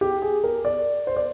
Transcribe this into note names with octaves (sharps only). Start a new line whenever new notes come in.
G4
G#4
A#4
D5
C5
D5